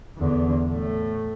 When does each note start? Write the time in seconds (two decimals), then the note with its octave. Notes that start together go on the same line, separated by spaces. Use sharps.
0.18 E2 D3
0.69 A2 A3